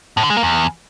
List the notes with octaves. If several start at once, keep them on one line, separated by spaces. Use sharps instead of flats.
A2
D3
G#3
A#3
E2